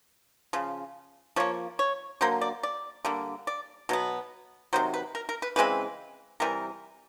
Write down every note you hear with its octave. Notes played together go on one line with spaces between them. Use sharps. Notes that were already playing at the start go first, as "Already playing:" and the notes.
C#3 F3
F3 A#3 C#5
C#5
D3 F#3 A#3 C5
D5
D5
D3 G3 A#3
D5
B2 F#3 B3
C3 D#3 F#3 C5
B4
A#4
A#4
B4
C#3 E3 G#3 C4 B4
C3 E3 G3 A#4